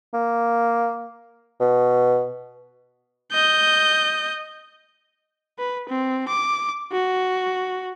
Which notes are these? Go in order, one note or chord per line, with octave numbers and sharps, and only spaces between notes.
A#3
B2
D#5 G6
B4
C4
D6
F#4